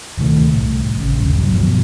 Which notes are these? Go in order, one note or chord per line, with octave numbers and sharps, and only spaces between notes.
D1 C3 D#3 A3
C2 A2
A1 C#3
D#1 G2 C#3
G2 B2 F#3
G2 B2 D3 F3